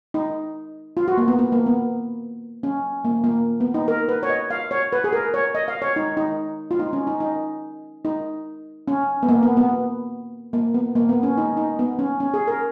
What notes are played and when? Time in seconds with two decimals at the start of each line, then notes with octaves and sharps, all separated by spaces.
0.14 D#4
0.97 F4
1.08 F#4
1.17 A#3
1.28 B3
1.39 B3
1.52 A#3
1.66 B3
2.63 C#4
3.05 A#3
3.24 A#3
3.60 B3
3.74 D#4
3.88 A#4
4.09 B4
4.23 C#5
4.30 D#5
4.50 F5
4.71 C#5
4.93 B4
5.04 G#4
5.13 A#4
5.34 C#5
5.55 D#5
5.68 F5
5.82 C#5
5.96 D#4
6.17 D#4
6.71 F4
6.79 D#4
6.93 C#4
7.07 D#4
7.20 D#4
8.05 D#4
8.88 C#4
9.23 B3
9.29 A#3
9.43 B3
9.57 B3
10.53 A#3
10.74 B3
10.95 A#3
11.09 B3
11.23 C#4
11.37 D#4
11.57 D#4
11.79 B3
11.99 C#4
12.20 C#4
12.34 G#4
12.48 A#4